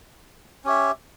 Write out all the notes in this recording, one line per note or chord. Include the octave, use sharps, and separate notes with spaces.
C#4 G4 C#5 E5